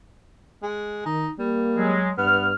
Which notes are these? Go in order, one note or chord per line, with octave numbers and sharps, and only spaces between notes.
G#3
D#3 D#4
G3 A#3
F#3 G#3
G2 B3 F6